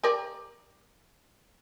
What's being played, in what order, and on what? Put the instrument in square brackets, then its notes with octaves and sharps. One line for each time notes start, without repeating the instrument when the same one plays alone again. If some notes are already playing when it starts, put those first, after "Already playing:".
[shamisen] G4 A#4 D5